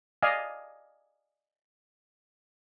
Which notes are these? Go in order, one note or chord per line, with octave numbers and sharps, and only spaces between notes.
D5 D#5 F5 G#5